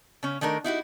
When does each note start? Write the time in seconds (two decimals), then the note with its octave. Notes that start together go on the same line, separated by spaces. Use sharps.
0.23 C#3 C#4
0.41 D#3 A3 D4 A#4
0.64 D#4 E4 F#4 G4